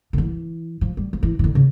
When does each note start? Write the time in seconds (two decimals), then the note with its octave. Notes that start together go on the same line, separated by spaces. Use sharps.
0.13 D3
0.18 E3
0.81 F3
0.97 G3
1.13 F3
1.23 E3
1.39 E3
1.44 D3
1.55 C#3